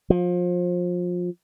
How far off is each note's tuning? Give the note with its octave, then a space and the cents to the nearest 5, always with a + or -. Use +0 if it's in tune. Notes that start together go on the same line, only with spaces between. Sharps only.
F3 +25